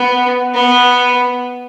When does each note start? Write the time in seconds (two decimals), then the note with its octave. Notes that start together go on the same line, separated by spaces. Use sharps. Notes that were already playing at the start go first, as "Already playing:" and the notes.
Already playing: B3
0.54 B3